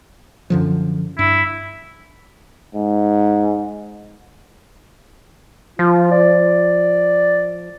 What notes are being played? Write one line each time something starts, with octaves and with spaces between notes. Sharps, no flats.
F#2 D3 F3
G2 E4
G#2
F3 F4
D5